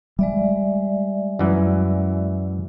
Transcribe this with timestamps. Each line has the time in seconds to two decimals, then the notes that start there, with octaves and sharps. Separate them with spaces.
0.19 G3 G#3 D5 E5
1.39 F#2 E3